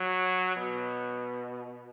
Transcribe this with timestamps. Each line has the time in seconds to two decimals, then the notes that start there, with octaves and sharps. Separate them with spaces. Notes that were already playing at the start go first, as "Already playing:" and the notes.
Already playing: F#3
0.56 B2